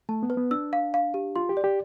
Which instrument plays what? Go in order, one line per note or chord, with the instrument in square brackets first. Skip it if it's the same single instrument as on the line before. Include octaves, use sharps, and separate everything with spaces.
[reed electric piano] A3 [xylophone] A5
[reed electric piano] B3
[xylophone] B4
[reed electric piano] B3
[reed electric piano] D4 [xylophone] E6
[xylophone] F5
F5
G4
[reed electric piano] F4 [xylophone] C6
[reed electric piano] G4
[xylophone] D5
[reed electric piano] G4